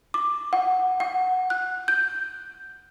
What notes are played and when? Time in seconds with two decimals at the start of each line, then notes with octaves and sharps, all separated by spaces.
0.14 D6
0.53 F#5
1.00 F#5
1.50 F#6
1.88 G6